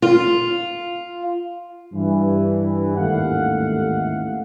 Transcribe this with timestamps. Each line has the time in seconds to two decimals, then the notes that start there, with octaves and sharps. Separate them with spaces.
0.02 F4
1.94 G2 E3
2.96 A1 D#2 G#2 A3 F5 F#5